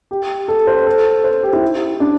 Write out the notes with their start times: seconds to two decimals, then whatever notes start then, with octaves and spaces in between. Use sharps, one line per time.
0.11 G4
0.48 A4
0.67 C5
0.87 A4
1.24 C5
1.43 G4
1.53 E4
2.00 D4